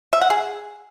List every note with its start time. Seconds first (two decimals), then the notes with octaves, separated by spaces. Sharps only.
0.13 E5
0.21 F#5
0.30 G#4